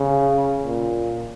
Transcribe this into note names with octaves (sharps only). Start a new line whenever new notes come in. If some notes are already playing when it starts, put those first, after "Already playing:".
Already playing: C#3
A#2